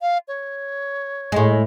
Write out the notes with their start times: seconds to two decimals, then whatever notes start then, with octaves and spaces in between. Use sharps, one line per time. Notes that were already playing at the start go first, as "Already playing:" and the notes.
0.01 F5
0.28 C#5
1.32 A2 G#3